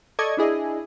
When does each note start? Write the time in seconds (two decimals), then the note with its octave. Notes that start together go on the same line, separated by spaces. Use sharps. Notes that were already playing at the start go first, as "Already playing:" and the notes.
0.19 A4 D5 D#5 C#6 G#6
0.37 D4 E4 G#4 D#5